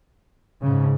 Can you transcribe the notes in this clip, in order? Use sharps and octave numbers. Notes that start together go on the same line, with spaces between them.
G#2 C#3